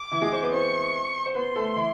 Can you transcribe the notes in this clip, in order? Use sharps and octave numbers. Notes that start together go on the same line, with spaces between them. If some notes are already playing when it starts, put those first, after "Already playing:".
Already playing: D6
E3 E4
G#3 G#4
C4 C5
B3 B4
C4 C5 C#6
C5
B3 B4 C6
A3 A4
E3 E4